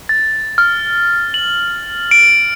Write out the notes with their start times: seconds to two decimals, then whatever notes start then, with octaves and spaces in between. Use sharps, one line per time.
0.09 A6
0.58 F6
1.34 F#7
2.11 D7